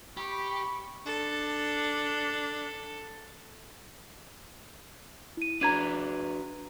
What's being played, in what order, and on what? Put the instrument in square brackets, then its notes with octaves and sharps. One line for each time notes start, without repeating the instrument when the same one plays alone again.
[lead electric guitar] G4 [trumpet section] B5 C#6
[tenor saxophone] D4 [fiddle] A4
[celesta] E4 D#7
[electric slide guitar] D4 F#4 B4 [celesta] A#5 G#6 D#7